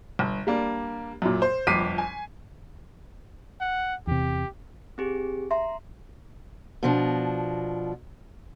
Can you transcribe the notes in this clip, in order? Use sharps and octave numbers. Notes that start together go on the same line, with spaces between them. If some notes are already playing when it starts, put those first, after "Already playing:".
G1
G3 A#3 D4
F#2 A#2
C5
G1 F2 D6 B6 C7 D#7
G#5
F#5
E2 C3 G4
C4 G4 G#4
E5 A#5 C6
B2 F3 D4